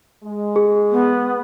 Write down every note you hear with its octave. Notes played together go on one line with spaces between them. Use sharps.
G#3
G#4
B3